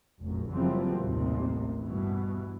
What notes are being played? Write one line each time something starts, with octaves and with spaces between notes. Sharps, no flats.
F1 A#1 F#2
F#1 F#2 E3 F3 G3 C4
A1 D#2 C3
G2 B2 E3